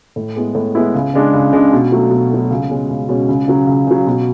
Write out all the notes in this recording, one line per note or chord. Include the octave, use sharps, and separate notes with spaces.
A2
G#3 B3 E4
A2
G#3 B3 E4
C#2
C#3 G#3 D4
C#2
C#3 G#3 D4
B2
F#3 A3
B2
F#3 A3
C#2
B2 G#3 C#4
C#2
B2 G#3 C#4
C#2
C#3 F#3
C#2
C#3 F#3
B2